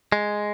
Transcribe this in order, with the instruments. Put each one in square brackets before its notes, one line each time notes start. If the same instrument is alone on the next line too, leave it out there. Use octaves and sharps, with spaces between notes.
[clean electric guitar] G#3